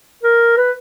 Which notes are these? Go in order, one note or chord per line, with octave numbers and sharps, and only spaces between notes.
A#4
B4